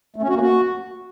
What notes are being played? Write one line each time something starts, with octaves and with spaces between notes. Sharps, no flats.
A3
C#4
F#4
A#3
F#4